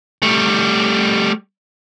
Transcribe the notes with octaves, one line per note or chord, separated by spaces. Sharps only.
G3 A3